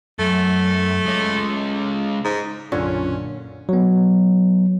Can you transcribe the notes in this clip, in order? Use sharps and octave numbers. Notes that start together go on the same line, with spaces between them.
F#2 A3
G#3 C#4
G#2
B1 F#2 A#2 D3 C#4 F4
F#3 B3